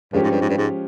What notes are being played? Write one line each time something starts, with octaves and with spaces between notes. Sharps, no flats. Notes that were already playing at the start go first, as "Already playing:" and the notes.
G2 F3 G#3 C#4 G4
G#2
G2
G#2
G2
G#2